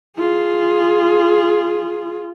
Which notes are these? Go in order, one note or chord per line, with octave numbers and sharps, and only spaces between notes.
F4 G#4